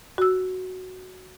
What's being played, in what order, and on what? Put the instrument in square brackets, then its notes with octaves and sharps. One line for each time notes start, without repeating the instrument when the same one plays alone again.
[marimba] F#4 E6